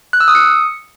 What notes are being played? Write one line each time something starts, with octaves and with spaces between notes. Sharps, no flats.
F#6
E6
D#6
C#7